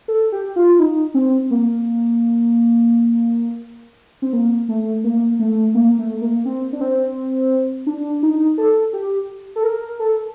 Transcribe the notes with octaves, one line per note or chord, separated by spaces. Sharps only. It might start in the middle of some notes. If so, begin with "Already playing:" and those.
A4
G4
F4
D#4
C4
A#3
C4
A#3
A3
A#3
A3
A#3
A3
A#3
C4
D4
C4
D4
D#4
A4
G4
A4
A#4
A4